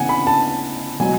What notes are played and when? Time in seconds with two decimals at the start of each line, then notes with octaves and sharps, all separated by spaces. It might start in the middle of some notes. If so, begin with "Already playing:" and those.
Already playing: C#3 E3 B3 E4 F#5 G#5
0.09 B5
0.27 A5
1.00 B2 F#3 B3 G#5